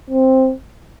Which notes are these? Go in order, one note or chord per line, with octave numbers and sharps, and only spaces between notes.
C4